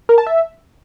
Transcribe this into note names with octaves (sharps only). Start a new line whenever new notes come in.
A#4
A5
E5